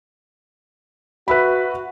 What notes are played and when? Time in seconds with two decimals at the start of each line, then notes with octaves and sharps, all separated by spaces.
1.28 F#4 B4 E5 B5